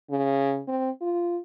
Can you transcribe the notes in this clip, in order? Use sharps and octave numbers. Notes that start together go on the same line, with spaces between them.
C#3
C4
F4